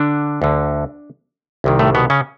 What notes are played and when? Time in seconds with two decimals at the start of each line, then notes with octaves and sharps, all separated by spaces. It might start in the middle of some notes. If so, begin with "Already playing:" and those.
Already playing: D3 D4
0.42 D2 D3
1.64 C2 C3 D#3
1.79 A2 A3
1.95 B2 B3
2.10 C#3 C#4